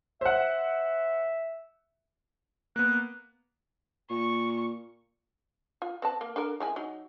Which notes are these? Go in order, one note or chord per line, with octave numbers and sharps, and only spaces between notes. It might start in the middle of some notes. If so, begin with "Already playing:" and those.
C5 E5 F#5
A#3 B3 F#6
A#2 C#6
F4
C4 B4 A5
A#3
D4 A4 A#4
G#3 E4 G#5
F#3 D#4